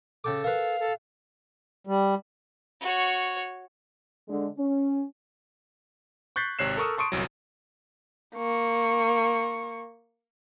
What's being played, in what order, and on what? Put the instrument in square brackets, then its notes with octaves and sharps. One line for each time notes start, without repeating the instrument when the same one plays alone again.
[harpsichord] C#3 G5 D6 [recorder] A4
[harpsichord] A#4 B4 [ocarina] F5
[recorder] A4
[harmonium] G3
[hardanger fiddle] F#4 C#5
[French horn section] D3 G#3
C#4
[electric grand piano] C#6 F#6 G6 A6 B6 C7
G#1 C3 C#5 F#6 C7 E7
A4 A#4 C#6 D#6 E6
A5 C6 C#6 D#6 D7
G1 C2 F#3
[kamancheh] A#3 C#6